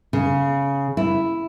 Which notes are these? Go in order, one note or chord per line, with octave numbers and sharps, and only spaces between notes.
C#3
E4